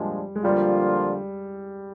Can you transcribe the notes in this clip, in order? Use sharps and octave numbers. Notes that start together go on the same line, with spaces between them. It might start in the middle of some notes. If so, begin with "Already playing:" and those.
Already playing: A#2 F3 G3 G#3 D4
G#3
D3 F3 G3 A#3 F4